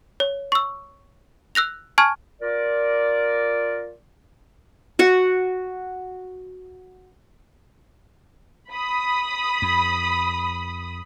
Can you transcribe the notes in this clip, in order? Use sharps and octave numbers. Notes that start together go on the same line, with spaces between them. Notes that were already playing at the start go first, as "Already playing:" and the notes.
C#5
C#6 E6
E6 F#6 A#6 F7
G#5 A5 C#6 F6 G#6
F4 A#4 D5
F#4 F#5
B5 D#6
F2